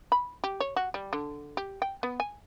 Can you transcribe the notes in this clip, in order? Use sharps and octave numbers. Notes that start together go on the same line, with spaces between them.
B5
G4
C#5
F#4
G3
D3
G4
G5
B3
G#5